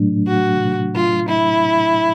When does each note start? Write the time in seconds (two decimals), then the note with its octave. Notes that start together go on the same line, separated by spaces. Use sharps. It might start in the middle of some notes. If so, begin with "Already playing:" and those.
Already playing: A2 F#3 A3 D4
0.28 F#4
0.95 F4
1.28 E4